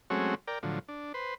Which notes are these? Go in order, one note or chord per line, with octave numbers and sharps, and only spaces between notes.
F#3 G#3 A3 C4 C#4 F#4
A#4 D5 G5
A2 D3 F3 F#3
D4
B4 C5